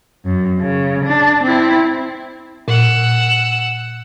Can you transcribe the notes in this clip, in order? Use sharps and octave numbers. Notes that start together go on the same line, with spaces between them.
F#2
C#3
D4
C4 E4
A#2 F#5 E6